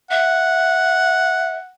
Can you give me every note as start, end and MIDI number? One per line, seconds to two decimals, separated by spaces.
0.11 1.57 76
0.11 1.72 78